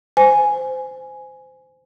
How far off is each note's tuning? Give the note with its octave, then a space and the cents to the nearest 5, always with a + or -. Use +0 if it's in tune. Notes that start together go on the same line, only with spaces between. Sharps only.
C5 -20 G#5 +5